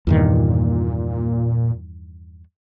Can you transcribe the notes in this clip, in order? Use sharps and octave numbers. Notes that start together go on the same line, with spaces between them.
E2 G2 A#2 D#3